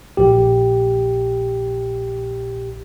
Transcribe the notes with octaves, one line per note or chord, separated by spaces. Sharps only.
A#1 G4